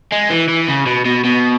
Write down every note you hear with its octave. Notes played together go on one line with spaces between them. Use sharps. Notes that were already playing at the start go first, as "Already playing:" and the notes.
G#3
E3
E3
C#3
B2
B2
B2